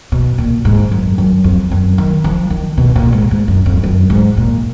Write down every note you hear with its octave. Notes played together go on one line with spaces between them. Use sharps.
B2
A#2
G#2
F#2
F#2
F2
F#2
D#3
F3
D#3
B2
A#2
G#2
G#2
F#2
F2
F#2
G#2
A#2